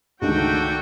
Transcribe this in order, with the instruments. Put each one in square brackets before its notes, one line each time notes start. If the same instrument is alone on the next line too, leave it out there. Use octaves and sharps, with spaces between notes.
[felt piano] C#2 D3 D#3 [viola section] A3 D4 G5 [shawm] F#4